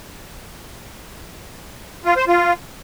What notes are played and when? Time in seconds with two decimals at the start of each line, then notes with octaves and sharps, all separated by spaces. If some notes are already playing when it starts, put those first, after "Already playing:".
2.05 F4
2.17 C5
2.28 F4